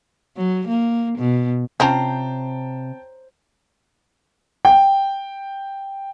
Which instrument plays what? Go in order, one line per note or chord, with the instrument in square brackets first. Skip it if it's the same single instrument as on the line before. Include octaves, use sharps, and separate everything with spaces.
[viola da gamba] F#3
A#3
B2
[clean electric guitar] C3 [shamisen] C4 C#4 F4 [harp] C5 A#5 [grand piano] G5 A5
[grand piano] G5